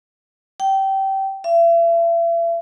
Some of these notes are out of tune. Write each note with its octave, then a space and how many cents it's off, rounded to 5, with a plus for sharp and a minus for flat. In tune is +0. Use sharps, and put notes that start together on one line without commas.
G5 -20
E5 +40